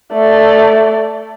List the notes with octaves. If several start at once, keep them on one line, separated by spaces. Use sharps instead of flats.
A3 D5